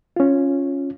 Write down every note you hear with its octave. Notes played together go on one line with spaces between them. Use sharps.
C#4 F4